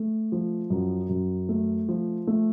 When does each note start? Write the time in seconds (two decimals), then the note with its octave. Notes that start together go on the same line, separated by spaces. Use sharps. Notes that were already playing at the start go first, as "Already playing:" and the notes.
Already playing: A3
0.32 F3
0.70 F#2
1.09 F#2
1.49 A3
1.89 F3
2.27 A3